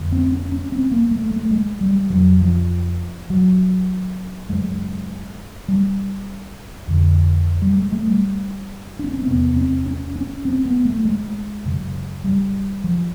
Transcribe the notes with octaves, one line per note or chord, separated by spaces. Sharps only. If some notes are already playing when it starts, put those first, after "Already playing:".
Already playing: F2 D3
C4
C#4
C#4
C4
A#3
A3
A3
G#3
G3
F2 C#3 F#3
F3
F#3
F#2 C#3 G#3
G3
F2 D3
G3
G#3
A3
G3
D4
C#4
C4
E2 C3 B3
C4
C#4
C#4
C4
B3
A3
G#3
F#2 C#3
G3
F3